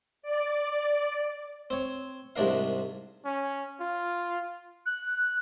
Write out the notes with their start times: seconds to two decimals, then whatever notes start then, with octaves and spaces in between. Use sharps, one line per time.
0.22 D5
1.70 C4 C#5
2.36 C2 G#2 C3 D4 A#4 F5
3.25 C#4
3.80 F4
4.86 F#6